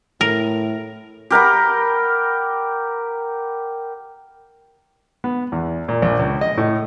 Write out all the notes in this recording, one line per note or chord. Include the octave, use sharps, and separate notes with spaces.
A2 A#4
G4 A#4 F#5 B5
B3
E2
A#2
A#1
C#2
D#5
A2